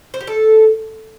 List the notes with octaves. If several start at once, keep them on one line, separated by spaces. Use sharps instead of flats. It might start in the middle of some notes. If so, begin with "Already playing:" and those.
C5
G4
A4